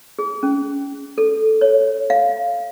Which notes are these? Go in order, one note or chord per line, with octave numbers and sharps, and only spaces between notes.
G#4
C#4
A4
C#5
F5